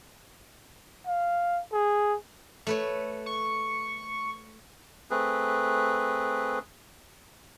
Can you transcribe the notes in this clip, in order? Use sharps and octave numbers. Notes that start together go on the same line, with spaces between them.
F5
G#4
A3 B4 C#5
C#6
A3 C4 G#4 B4